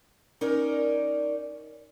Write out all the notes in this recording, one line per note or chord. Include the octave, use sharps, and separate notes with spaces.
C#4 D#4 A#4 D5